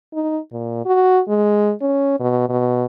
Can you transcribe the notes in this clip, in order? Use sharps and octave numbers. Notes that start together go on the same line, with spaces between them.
D#4
A#2
F#4
G#3
C#4
B2
B2